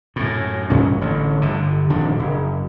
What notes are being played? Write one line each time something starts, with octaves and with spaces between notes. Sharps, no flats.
F#2 A2
A1 G2 C#4
A1 D3
G1 D3
D#1 F2 D#3 D4
F#1